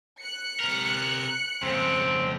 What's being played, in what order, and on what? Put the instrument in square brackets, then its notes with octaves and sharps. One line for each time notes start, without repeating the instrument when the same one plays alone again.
[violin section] F#6 C#7
[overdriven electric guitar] C3 A#4
[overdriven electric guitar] F2 C#3 [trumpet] C4